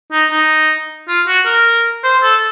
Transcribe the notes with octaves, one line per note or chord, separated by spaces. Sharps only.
D#4
D#4
F4
F#4
A#4
C5
A4